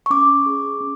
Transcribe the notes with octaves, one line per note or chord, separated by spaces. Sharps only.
C#6
C#4 D6
G#4
C#4